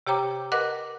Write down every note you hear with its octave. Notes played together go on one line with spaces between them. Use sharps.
C3 G4 C#5 G5 A#5 D6
A#4 B4 D#5 F#5 D6 F#6